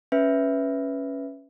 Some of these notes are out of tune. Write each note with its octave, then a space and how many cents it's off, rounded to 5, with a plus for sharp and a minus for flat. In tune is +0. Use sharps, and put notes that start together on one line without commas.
C#4 +0 B4 +0 E5 +0